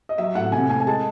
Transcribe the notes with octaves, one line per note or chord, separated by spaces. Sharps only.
D#5
F#3 E5
A2 F#5
C3 G#5
A3 G#5
G#5
G#3 A5